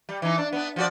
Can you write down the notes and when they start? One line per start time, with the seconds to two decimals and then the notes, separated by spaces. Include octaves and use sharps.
0.09 G3
0.22 E3 D#4
0.38 D4
0.53 B3 D4
0.76 F3 F#4 D5